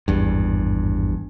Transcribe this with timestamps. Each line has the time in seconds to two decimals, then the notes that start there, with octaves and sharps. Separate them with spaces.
0.08 G#1 E2 G2